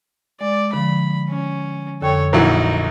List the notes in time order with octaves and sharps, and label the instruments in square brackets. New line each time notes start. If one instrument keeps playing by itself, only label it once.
[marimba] G#3 [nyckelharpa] D5
[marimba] D3 F3 [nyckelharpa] B5
[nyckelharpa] C#4
[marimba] F2 D3 G5 [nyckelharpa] A4 C#5
[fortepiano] A#1 E3 F#3 [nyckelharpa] D#4 A#4 [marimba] C#6